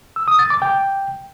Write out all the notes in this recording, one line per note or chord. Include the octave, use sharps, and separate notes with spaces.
E6
D#6
A6
D6
G5